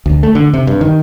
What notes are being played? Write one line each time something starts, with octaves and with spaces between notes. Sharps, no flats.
D2
A3
D3
C3
G2
D#3